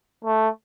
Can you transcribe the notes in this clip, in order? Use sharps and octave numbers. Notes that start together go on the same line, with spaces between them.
A3